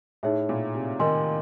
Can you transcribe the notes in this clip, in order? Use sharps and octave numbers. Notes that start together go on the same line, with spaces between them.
A2 D#4 G#4 C#5 E5
A#2
C3
D#3 A#4 D#5 G#5 C6